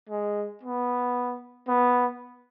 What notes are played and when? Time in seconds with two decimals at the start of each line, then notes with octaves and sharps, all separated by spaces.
0.09 G#3
0.63 B3
1.68 B3